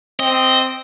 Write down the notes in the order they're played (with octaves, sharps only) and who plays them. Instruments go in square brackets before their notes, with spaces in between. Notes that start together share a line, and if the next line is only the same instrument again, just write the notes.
[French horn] C4 [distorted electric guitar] D#5